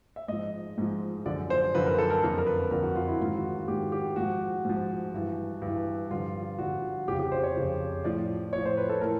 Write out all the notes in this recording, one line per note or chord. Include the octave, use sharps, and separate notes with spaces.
E5
G#2 F3 D#5
G#2 F3
F#2 D3 F3 D5
C5
F#2 D3 F3 B4
A#4
A4
A#4
F2 D3 F3 A#4
A#4
B4
F2 D3 F3 A#4
F#4
F4
E4
G#2 D#3 F4
F#4
F#4
G#2 D#3 G4
G4
G#2 F3 F#4
G#2 F3
G2 E3
G2
E3
G2 D3 F3 F4
G2 D3 F3 F#4
F2 C#3 F3 G4
G4
C5
C#5
F2 C#3 F3
A2 F3 D5
A2 F3 C#5
C5
B4
A4
A2 E3 A#4